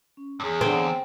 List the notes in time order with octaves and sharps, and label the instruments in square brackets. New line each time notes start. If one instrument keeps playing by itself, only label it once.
[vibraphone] C#4
[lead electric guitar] E2 G2 [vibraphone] G#4 C#5
[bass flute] D3 [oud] C4